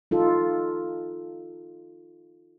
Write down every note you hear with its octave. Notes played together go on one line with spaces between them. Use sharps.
D#4 F4 A4